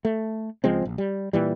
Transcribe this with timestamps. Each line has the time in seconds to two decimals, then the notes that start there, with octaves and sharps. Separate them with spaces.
0.05 A3
0.64 C#2 F3 G#3 C4
0.85 A#1
0.98 G3
1.33 A#2 E3 G3